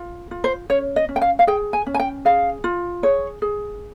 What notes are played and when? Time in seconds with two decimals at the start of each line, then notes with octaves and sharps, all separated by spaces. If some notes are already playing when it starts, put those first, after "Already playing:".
Already playing: F4
0.31 F4
0.44 C5
0.70 C#4 C#5
0.96 D#5
1.09 C#4
1.16 G5
1.21 F5
1.39 F5
1.47 G#4 G5
1.73 G#5
1.86 C#4
1.94 G#5
1.99 G5
2.25 G#4 F5
2.64 F4
3.03 G#4 C#5
3.42 G#4